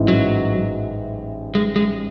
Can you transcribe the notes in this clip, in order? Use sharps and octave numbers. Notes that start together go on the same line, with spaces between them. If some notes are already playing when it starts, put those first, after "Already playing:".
Already playing: A1 G#2 E3
F#3
G#3
G#3